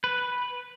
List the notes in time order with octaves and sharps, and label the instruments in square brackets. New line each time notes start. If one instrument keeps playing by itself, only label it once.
[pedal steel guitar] B4